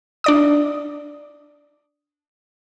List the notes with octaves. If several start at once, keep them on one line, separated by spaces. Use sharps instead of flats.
D4 D5 D#6